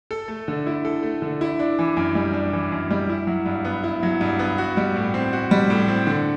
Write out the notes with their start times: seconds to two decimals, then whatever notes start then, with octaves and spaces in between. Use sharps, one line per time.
0.11 A4
0.28 A3
0.48 D3
0.67 E4
0.85 A4
1.03 A3
1.22 D3
1.41 E4
1.59 D4
1.79 E3
1.97 F#2
2.15 G3
2.33 D4
2.53 E3
2.72 F#2
2.91 G3
3.09 E4
3.27 F#3
3.46 G2
3.65 B3
3.84 E4
4.03 F#3
4.21 G2
4.39 B3
4.58 F#4
4.77 G3
4.96 A2
5.14 C4
5.33 F#4
5.51 G3
5.70 A2
5.88 C4
6.07 D3